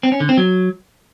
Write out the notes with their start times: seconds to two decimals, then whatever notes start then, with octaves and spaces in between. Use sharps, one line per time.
0.03 C4
0.12 C#4
0.20 D3
0.29 C4
0.37 F#3